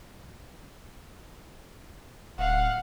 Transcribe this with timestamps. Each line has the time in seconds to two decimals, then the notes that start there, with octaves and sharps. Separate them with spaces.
2.38 D1 F5 F#5